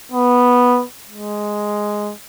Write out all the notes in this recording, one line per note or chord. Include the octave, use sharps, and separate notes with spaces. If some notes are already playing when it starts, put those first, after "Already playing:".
B3
G#3